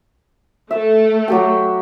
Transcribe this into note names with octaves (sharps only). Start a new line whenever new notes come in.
A3 A4 E5
F#3 G4 G5